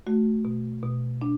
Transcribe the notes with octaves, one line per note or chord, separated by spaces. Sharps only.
A3 F#4
B2
B2
D4